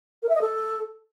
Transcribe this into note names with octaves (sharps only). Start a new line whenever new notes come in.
A#4
E5
D#5
A4